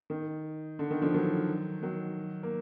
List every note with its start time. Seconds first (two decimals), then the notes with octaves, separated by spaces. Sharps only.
0.10 D#3
0.79 D3
0.91 D#3
1.02 D3 F3
1.14 D#3 F#3
1.83 D#3 F#3
2.43 A#3